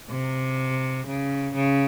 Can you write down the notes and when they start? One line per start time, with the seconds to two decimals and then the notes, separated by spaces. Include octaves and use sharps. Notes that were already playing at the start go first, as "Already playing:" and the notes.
0.10 C3
1.07 C#3
1.55 C#3